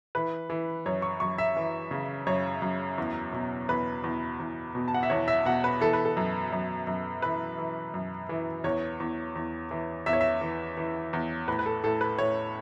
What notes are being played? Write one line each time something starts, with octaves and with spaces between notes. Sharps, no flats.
E3 B4
E3
F#2 C#5
C#6
F#2 C#6
E5
E3
C#3
F#2 C#5
F#2
E2
B2
E2 B4
E2
E2
B2
A5
F#5
E5
E2 C#5
E5
B2 F#5
B4
E3 A4
B4
A4
F#2
F#2
F#2
E3 B4
E3
F#2
E3
E2 C#5
E2
E2
E3
E2 E5
C#5
E5
E3
E3
E2
A2 B4
B4
A4
A2 A4
B4
A2 C#5